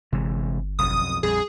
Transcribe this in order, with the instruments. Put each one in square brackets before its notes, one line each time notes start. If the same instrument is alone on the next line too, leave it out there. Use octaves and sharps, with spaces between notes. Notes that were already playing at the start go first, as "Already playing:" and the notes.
[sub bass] G1 [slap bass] C3 E3 G#3
[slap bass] B1 F2 [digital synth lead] D#6
[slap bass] A#1 F2 G3 [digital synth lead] G#4